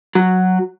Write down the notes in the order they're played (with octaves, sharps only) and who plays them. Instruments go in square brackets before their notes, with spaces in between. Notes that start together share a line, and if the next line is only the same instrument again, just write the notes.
[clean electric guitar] F#3